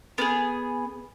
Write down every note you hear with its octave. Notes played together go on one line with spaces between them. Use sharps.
B3 D4 G#4